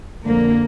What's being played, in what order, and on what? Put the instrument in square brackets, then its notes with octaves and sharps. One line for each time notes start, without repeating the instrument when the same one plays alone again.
[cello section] F2 D3 A#3